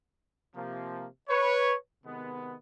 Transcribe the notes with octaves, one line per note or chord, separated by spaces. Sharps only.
C3 F3 A#3
B4 C#5
C3 D#3 G#3 B3